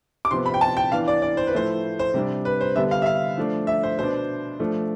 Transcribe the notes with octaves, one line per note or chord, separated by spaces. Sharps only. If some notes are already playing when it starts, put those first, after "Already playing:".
D6
C3 F3 B3 C6
B5
G5
A5
G5
E3 B3 D4 F5
D5
D5
C5
B4
A2 F3 A3 E4 C5
C5
C3 G3 D4
B4
C5
D3 G3 B3 D4 E5
F5
E5
F5
F3 A3 D4
E5
C5
B2 B3 D4 C5
F3 A3 D4